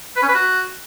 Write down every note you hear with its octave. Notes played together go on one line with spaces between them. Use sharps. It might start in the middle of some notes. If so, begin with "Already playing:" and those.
B4
C#4
B4
F#4